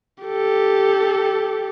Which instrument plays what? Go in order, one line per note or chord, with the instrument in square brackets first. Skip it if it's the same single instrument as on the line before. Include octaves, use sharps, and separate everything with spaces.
[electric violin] G4 A4